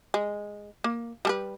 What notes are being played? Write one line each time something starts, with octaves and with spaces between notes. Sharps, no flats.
G#3
A#3
G3 A4 B4